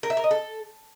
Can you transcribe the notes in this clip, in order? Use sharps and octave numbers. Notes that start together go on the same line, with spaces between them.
A#4
E5
A#4
D#5
A4